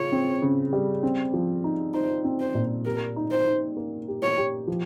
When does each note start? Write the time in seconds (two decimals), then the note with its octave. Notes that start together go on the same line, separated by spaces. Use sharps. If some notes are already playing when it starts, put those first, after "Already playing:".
Already playing: C#3 F4 C#5
0.12 C4
0.42 C#3
0.73 G3
1.03 C4
1.34 F3
1.64 D#4
1.94 D#4 C5
2.24 C4
2.40 C5
2.55 A#2
2.85 G4 A#4
3.16 D#4
3.31 C5
3.47 D#4
3.77 A#3
4.08 G4
4.23 C#5
4.37 G4
4.68 F3